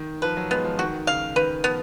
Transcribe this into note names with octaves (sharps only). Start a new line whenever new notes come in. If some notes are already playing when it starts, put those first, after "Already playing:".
Already playing: D#3
F3 B4
F#3
G#3 B3
F3
D#3 F#4
C#3 F5
D#3 B4
F3 B3